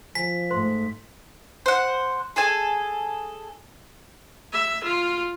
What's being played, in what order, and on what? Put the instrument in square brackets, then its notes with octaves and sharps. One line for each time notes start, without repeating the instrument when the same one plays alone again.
[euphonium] F3 [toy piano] G#5 [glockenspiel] B6
[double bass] G#2 A3 [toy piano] C5 C6
[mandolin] C5 F#5
G#4 A4 G#5
[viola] E5
F4